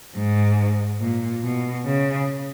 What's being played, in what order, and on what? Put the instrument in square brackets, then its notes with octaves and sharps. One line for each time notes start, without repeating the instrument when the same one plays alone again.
[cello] G#2
A#2
B2
C#3